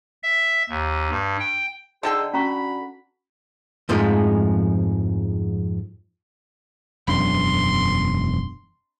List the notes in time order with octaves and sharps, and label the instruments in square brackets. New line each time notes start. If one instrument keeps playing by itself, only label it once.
[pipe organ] E5
D#2
G2
G5
[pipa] D3 A4 G5 [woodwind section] D#4 G#4 C5
[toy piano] C#4 A#5 C#6 [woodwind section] F#4 B5
[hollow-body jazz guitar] F2 G#2 F3 G#3 A3
[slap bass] E1 F#2 D4 [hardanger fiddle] C6